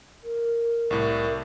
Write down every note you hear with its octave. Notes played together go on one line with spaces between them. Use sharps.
A#4
C2 A2